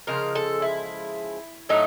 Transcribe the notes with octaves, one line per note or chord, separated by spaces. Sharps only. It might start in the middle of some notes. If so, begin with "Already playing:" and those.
C#3 F3 G#3 A#4
A4
E4
A2 F#3 A3 D#4